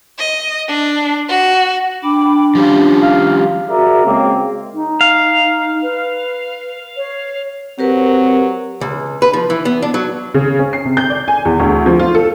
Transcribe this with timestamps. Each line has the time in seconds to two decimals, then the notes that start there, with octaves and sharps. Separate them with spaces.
0.19 D#5
0.68 D4
1.29 F#4
2.03 D4 G5 B5 D6
2.55 F3 G3 C#4 F4 G4
3.03 F5
3.70 F#4 G#4 A#4 D5 E5
4.05 C#3 G#3 A#3 C4
4.74 D#4
5.01 F5
5.82 B4
6.97 C#5
7.79 F#3 C4 G4 A#4 B4
8.81 C#2
9.22 B4
9.33 F3
9.50 E3
9.65 B3
9.82 D4
9.94 F#3
10.34 C#3
10.59 C#4
10.73 C7
10.85 C3
10.97 G6
11.10 D5
11.28 G#5
11.45 E2
11.60 D2
11.86 F3
11.99 F4
12.15 A4